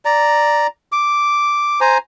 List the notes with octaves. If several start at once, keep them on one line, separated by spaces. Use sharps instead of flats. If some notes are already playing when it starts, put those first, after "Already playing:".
D5 A#5
D6
C5 G#5 A#5